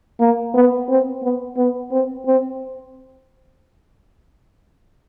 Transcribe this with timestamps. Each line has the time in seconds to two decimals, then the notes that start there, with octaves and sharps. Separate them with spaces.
0.20 A#3
0.54 B3
0.89 C4
1.22 B3
1.56 B3
1.91 C4
2.26 C4